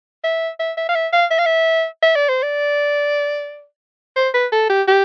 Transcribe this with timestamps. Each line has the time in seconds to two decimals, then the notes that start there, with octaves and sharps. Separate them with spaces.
0.24 E5
0.60 E5
0.77 E5
0.89 F5
0.95 E5
1.13 F5
1.31 E5
1.39 F5
1.46 E5
2.03 E5
2.16 D5
2.29 C5
2.43 D5
4.16 C5
4.34 B4
4.52 A4
4.70 G4
4.88 G4